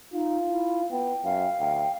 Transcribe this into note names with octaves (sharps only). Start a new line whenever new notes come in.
D#4 F4
E4
B3 G5
F#2 F5
D2 G5